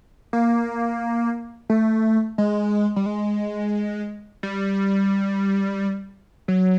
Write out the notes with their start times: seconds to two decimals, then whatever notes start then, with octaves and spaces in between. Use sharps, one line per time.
0.33 A#3
1.70 A3
2.38 G#3
2.96 G3
3.06 G#3
4.43 G3
6.48 F#3